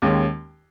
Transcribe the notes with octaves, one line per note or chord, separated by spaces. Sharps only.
D#2 D#3 G#3 C#4